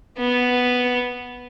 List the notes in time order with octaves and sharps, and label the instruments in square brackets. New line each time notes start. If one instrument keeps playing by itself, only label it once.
[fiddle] B3